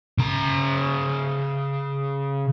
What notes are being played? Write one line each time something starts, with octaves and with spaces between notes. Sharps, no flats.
C#3 A#5